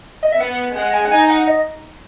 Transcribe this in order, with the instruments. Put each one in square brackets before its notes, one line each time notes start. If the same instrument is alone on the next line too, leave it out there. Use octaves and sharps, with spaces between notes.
[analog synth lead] D#5
E5
[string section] B3 [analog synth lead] F#5
[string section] G#3 [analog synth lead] F#5
[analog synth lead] G#5
F#5
[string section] D#4 [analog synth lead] G#5
[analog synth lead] F#5
D#5